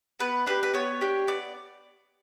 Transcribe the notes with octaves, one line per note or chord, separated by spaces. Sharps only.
B3 B4
D4 G4 B4
B4
B3 C#5
D4 G4
B3 D5